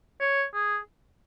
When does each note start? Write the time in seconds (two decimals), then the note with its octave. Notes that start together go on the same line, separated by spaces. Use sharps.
0.20 C#5
0.54 G#4